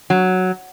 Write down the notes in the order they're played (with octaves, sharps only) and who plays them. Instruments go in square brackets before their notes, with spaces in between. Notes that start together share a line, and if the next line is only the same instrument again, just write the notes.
[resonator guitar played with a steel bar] F#3